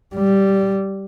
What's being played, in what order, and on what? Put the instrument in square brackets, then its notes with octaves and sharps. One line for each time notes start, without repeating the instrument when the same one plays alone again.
[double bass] G3